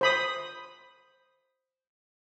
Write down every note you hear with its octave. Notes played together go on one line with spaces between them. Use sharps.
C5 B5 D#6